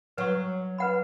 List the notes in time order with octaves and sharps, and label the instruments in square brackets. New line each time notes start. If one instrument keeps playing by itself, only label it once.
[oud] F#3 [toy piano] B4 F#5 C#6
[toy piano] B4 F#5 B5